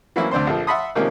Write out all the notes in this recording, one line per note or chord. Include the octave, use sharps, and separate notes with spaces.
E3 F#3 A#3 C4 C#4 E4
D2 C4 D4 C5 C6
A#1 F3 A4
E5 F#5 A5 B5 C6 D#6
C3 D#3 F3 G#3 A#3 C#4